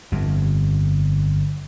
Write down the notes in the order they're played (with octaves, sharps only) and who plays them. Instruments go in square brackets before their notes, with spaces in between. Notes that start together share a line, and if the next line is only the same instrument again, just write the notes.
[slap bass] G1 F2